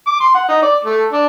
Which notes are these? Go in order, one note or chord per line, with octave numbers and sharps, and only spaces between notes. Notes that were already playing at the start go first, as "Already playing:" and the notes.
D6
C6
F#5
D#4
D5
A3
D4